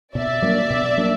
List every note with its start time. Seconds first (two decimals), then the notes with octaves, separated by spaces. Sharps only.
0.15 B2 D5 E5
0.42 F#3 A#3 D4
0.70 B2
0.98 F#3 A#3 D4